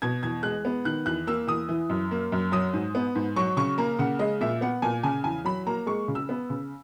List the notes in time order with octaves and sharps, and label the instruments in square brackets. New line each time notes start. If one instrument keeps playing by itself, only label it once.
[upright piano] B2 G#6
E2 G#6
G#3 F#6
B3
D#3 F#6
E2 F#6
A#3 E6
E2 D#6
E3
F#2
A#3
F#2
F#3 D#6
G#2
B3
G#2
F#3 C#6
C#3 C#6
A#3 A#5
C#3 F#5
G#3 D#5
A#2 E5
B3 F#5
A#2 G#5
C#3 G#5
E2 G#5
F#3 B5
A#3 A#5
G#3 C#6
C#3
E6
B3
C#3